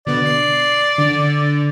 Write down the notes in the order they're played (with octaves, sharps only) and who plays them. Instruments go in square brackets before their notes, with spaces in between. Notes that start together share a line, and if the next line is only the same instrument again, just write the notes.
[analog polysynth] B2 D3 B3 [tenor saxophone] D5
[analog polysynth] C7
D3